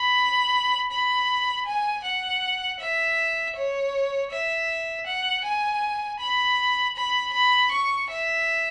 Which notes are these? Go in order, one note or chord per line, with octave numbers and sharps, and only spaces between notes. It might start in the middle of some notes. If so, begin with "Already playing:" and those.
Already playing: B5
B5
G#5
F#5
E5
C#5
E5
F#5
G#5
B5
B5
B5
C#6
E5